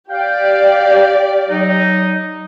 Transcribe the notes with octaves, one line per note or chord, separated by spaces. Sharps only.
G4 D5 F5 G5
F#3 D#4